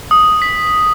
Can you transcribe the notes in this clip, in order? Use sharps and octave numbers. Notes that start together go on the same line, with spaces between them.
D#6
B6